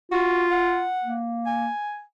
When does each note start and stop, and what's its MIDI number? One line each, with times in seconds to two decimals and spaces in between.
0.11 0.90 65
0.11 0.46 66
0.51 1.17 78
1.04 1.69 58
1.46 2.02 80